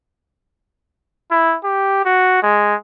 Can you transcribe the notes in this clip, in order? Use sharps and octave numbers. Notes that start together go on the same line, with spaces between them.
E4
G4
F#4
G#3